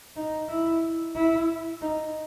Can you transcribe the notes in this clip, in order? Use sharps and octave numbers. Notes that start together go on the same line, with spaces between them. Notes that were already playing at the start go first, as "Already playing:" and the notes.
D#4
E4
E4
D#4